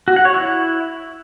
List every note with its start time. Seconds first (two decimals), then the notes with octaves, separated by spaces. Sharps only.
0.08 F#4
0.16 F#5
0.25 C#5
0.34 E4